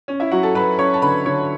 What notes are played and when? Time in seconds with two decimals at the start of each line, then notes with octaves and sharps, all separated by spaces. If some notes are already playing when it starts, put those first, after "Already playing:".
0.08 C#4
0.20 E4 E5
0.31 F#3 F#4 F#5
0.43 A4 A5
0.55 F#3 B4 B5
0.78 C#4 C#5 C#6
0.94 A5
1.02 D3 B4 B5
1.25 D3 C#5 C#6